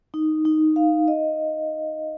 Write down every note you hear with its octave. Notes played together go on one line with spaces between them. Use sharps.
D#4
D#4
F5
D#5